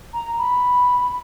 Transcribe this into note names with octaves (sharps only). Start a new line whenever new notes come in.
A#5
B5